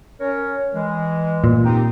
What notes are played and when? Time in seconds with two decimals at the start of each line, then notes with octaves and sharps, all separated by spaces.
0.21 C#4 A#4 C#5
0.73 E3 G#3
1.44 A#2
1.65 C4 D#4 G4